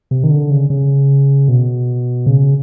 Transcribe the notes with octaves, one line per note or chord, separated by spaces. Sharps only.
C3
D#3
D3
C#3
C#3
B2
C#3